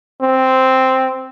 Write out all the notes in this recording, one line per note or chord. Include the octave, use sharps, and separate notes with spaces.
C4